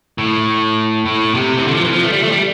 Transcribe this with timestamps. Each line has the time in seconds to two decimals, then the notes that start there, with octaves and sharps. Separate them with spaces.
0.18 A2
1.06 A2
1.35 C3
1.58 E3
1.65 D3
1.74 F3
1.84 E3
1.93 F3
2.03 A3
2.12 G3
2.23 A3
2.32 G3